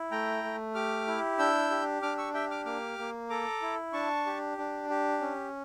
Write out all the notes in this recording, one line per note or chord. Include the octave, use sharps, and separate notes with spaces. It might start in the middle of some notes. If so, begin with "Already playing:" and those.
Already playing: E4
A3 G5 A#5
A3
G4 D6 F6
E4
D4 E6 G6
G4
D4 D6 F6
C#6 E6
G4 E5 G5
D6 F6
A#3 D6 F6
A#3
A4 A#5 D6
E4
D4 A5 C#6
G4
D4
G4
C#4